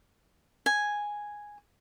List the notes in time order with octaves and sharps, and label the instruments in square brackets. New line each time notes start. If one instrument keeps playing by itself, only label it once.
[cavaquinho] G#5